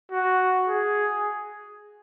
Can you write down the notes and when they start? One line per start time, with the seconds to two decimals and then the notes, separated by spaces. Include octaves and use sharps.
0.12 F#4
0.68 G#4